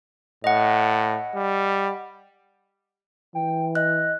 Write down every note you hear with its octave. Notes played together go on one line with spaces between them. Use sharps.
A2 D#5 F#5
G3
E3 G5
D#5 F#6